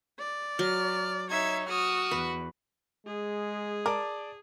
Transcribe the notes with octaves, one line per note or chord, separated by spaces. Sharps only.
D5
F#3 F6
D#4 C#5 E5 G#6
F#4 D#6 F6
E2 B4
G#3 G#4
A#4 D5 A5 D6